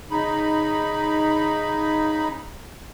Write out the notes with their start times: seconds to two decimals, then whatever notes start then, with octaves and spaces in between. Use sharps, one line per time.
0.11 C#3 D#4 B5